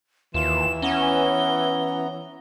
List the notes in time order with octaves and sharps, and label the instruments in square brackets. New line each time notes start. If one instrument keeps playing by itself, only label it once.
[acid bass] D#2 [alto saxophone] E3 [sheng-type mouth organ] F4 [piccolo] E7
[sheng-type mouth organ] B3 A#5 [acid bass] C#4 [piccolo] G7